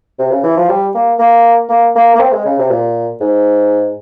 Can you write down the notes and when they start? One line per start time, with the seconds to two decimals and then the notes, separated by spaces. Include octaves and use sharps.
0.19 C3
0.31 C#3
0.44 E3
0.57 F3
0.69 G3
0.94 A#3
1.19 A#3
1.69 A#3
1.96 A#3
2.15 A#3
2.20 C4
2.32 G#3
2.45 C#3
2.59 C3
2.71 A#2
3.21 G#2